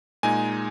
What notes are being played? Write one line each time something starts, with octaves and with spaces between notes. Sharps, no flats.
A#2 G#3 D#4 G#5